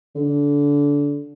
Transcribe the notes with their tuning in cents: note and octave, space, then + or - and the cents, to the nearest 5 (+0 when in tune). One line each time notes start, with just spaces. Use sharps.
D3 -25